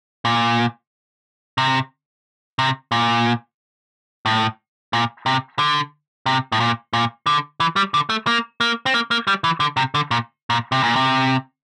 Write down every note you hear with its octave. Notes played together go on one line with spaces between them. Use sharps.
A#2
C3
C3
A#2
A2
A#2
C3
D3
C3
A2
A#2
A#2
D3
E3
G3
D3
A3
A#3
A#3
C4
A#3
A#3
G3
E3
D3
C3
D3
A#2
A#2
C3
A#2
C3